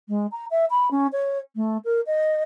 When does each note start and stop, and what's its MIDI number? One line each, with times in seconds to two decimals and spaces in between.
0.08 0.27 56
0.32 0.45 82
0.51 0.65 76
0.70 0.90 83
0.91 1.07 61
1.12 1.38 73
1.56 1.77 57
1.85 2.01 70
2.06 2.43 75